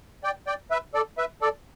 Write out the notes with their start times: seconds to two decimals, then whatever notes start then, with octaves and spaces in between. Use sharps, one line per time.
0.24 D5 G5
0.47 D5 G5
0.71 B4 E5
0.94 A4 D5
1.18 B4 E5
1.41 A4 D5